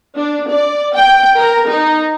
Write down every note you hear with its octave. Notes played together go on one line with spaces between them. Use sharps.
D4
D5
G5
A#4
D#4